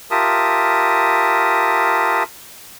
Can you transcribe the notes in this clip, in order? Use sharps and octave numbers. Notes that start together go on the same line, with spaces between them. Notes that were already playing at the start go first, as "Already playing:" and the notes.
F4 G4 A#4 E5 A5 D#6